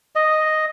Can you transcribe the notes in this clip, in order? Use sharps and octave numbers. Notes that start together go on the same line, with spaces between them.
D#5